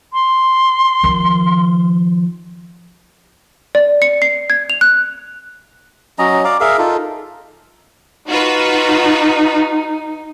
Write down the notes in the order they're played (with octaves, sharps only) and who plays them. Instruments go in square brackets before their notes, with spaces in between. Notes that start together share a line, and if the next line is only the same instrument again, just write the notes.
[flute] C6
[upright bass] D#3 F3
[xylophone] D5
C#7
C7
G#6
F7
F#6
[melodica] F#3 C#4 D#5 A#5
D5 F5 A#5 D6
G#4 A#4 E5 F5
D#4 F4 A4
[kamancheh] D#4 [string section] F4 F#4 B4